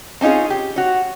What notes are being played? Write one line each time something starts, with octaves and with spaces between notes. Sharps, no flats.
C4 C#4 D#4 F4 G#4
G4
F#4 C#5